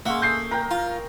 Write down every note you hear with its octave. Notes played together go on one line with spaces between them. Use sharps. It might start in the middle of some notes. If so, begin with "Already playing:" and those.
G#3 A#3 C#4 E5 F#5
A3 A4 D#6 G6 C7
A#4 G5 A#5
F4